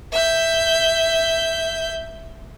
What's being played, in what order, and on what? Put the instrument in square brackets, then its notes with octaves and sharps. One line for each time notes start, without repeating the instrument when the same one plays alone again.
[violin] E5 G6